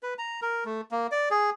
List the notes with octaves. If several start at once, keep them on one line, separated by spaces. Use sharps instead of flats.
B4
A#5
A#4
A3
A#3
D5
G#4